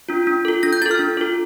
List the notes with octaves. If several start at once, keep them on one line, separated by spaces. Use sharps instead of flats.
D4 F4
D4
F4 A4
D4 A#6
G6
F4 A4 A6
F6
D4
F4 A4